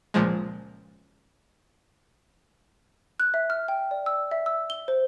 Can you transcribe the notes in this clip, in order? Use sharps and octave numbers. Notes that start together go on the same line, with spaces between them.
C#2 A#2 F3 G#3
F#6
E5
F6
G5
D5
E6
E5
E6
G7
C5